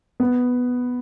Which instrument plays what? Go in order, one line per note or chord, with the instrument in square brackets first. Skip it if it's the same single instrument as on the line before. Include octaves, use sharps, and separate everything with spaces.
[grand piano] B3